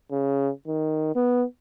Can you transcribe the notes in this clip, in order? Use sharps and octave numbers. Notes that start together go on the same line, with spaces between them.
C#3
D#3
B3